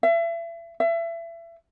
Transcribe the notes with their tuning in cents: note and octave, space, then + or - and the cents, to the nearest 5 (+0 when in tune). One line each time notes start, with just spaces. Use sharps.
E5 +35
E5 +30